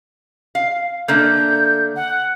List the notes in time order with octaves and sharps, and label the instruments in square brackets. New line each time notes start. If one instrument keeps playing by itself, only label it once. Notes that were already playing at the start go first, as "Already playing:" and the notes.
[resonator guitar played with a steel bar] F5
[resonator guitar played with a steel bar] D3 A3 A#3 [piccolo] G6
[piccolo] F#5